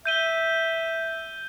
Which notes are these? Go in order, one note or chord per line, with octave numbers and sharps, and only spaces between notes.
E5 G6 D#7 G7